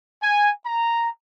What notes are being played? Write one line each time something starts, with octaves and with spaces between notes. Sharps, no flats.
G#5
A#5